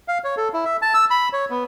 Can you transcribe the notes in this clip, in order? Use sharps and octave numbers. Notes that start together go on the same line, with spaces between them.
F5
C#5
A4
E4
E5
A5
E6
B5
C#5
B3